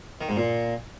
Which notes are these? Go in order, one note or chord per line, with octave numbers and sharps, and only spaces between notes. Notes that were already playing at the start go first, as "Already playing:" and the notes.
D#3
G#2
A#2